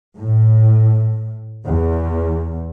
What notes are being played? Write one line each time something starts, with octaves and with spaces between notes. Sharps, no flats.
A2
E2